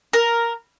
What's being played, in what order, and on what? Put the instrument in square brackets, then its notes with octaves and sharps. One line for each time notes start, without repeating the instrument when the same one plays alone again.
[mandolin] A#4